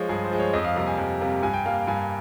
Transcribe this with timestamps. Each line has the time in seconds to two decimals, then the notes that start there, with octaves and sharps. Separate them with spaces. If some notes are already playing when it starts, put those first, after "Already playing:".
Already playing: F3 G#3 C#5
0.09 G2 G#4
0.24 C5
0.31 F3 G#3
0.39 C#5
0.53 F2 D#5
0.65 F5
0.76 C3 G3 A#3 F5
0.87 G#5
0.98 F2
1.21 C3 G3 A#3
1.43 G2 G#5
1.54 G5
1.65 G3 A#3 F5
1.87 G2 G#5